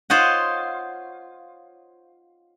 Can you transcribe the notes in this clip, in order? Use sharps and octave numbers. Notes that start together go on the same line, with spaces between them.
F4 C5 C#5 D#5 F#5